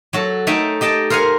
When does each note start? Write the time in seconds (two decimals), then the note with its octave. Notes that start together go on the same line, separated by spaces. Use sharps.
0.13 F#3 F#4 A4
0.47 A3 D#4 E5 G5 G#5
0.81 G4 D#5 G5 A5
1.10 A#4 C5 F5 F#5 G#5